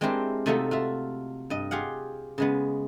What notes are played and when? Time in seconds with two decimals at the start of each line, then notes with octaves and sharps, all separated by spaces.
0.01 G#3 C4 D4 E4 G4 A#4
0.46 C3 A3 D#4 F4 F#4 A4
0.71 F4 F#4 E5
1.50 G2 D#5
1.71 F4 G4 G#4 F5 F#5
2.38 C#3 G#3 B3